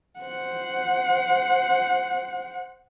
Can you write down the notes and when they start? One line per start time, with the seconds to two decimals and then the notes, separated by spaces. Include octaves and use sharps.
0.20 C5 F#5